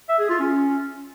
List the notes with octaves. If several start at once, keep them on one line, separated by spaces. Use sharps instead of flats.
E5
G#4
F4
C#4